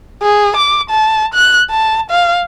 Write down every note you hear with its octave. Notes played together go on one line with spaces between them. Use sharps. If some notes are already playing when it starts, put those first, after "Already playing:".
G#4
D6
A5
F#6
A5
F5